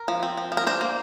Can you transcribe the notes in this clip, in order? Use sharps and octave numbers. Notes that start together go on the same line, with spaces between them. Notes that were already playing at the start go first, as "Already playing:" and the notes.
Already playing: A#4
F3
C4
F3
F3
A#4
D4 C5
A#3